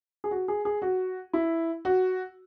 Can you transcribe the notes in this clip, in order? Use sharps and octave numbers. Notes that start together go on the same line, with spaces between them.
G#4
F#4
G#4
G#4
F#4
E4
F#4